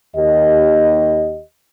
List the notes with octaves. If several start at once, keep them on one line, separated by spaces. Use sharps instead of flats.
D#2 G4 D#5